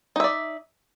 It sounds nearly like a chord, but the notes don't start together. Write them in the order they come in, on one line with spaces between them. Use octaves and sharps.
D#4 E5 D5